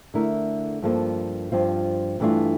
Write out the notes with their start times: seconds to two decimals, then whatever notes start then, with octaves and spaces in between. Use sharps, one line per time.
0.14 D3 A3 E4 A#4
0.82 G2 F3 A#3 F4 A4
1.52 G2 F3 C4 F4
2.20 G2 E3 A3 D4 F4